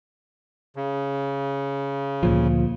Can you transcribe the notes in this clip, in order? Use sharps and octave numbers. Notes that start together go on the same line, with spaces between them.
C#3
D2 A#2 F3